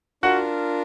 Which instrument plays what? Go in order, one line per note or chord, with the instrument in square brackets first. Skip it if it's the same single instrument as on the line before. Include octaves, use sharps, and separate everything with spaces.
[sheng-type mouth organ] D4 F4 A#4 [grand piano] F#4 F#5